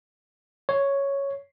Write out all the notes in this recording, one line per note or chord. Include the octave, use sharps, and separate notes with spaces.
C#5